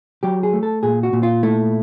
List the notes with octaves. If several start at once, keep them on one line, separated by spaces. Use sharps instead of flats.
F#3 G4
G#4
A3
A4
A#2 G#4
F#4
A#2
F4
A3 E4